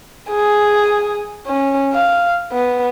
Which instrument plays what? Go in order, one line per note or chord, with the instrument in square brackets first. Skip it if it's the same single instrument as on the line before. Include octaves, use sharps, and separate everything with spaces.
[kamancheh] G#4
C#4
F5
B3